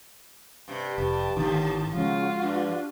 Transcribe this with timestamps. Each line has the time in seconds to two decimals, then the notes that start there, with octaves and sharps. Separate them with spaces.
0.68 G2 C3
0.98 F1 G2 G4 A5
1.37 G#1 D#2 A2 D3 D#3
1.94 C#3 F3 G#3 F4 F#4
2.42 G2 D4